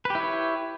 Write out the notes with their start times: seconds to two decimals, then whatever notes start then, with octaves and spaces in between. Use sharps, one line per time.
0.05 B4
0.10 G4
0.15 E4
0.20 C#5